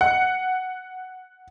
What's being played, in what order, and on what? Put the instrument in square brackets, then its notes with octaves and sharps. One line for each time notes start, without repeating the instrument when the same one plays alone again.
[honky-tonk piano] F#5